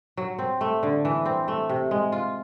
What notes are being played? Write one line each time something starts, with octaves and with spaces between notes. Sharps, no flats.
F#3
C4
A3
D3
E3
C4
A3
C3
G#3
F4